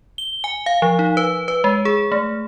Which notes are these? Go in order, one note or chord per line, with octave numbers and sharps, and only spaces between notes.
G7
G#5
F5
F3
D#4
B4
B4
G#3
G#4
A3